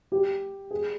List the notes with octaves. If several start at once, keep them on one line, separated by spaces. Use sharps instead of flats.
G4
G#4